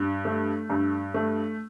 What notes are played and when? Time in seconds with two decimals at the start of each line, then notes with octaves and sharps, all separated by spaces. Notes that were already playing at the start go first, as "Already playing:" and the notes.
Already playing: G2
0.25 A3
0.70 G2
1.14 A3